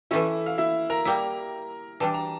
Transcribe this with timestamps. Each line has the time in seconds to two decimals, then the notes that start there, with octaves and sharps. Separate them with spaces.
0.11 E3 A3 C#4 E4 E5
0.46 F5
0.58 E4 E5
0.90 A#4 A#5
1.05 G3 A#3 E4
2.00 E3 G3 D4 A5
2.14 A#5